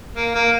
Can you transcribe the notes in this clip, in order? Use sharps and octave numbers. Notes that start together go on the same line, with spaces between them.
A#3
A#3